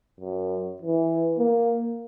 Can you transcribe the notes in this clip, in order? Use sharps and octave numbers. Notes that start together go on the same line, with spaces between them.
F#2
E3
A#3